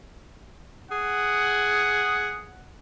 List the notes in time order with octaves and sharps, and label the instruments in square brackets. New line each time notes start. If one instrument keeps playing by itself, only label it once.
[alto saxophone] G#4 [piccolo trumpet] F#5